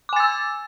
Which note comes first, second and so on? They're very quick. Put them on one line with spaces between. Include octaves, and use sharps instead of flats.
D6 G#5 A6 E6